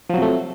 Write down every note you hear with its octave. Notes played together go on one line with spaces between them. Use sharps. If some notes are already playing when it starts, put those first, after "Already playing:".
C3 F3 F#3 A3